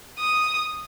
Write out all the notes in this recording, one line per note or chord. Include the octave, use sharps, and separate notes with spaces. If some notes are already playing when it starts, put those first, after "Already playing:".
D#6